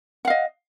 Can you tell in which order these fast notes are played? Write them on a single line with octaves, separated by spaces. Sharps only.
F#5 F5 D#5